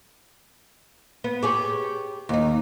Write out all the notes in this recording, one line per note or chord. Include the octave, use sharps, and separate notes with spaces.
B3
G4 G#4 C#5
D#2 D#4